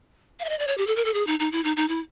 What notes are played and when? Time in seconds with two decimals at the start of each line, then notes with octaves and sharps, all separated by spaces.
0.40 F5
0.45 E5
0.49 D#5
0.59 D5
0.67 C#5
0.78 G4
0.87 A4
0.96 A#4
1.05 A4
1.14 G#4
1.27 D#4
1.40 D#4
1.52 E4
1.64 D#4
1.77 D#4
1.88 E4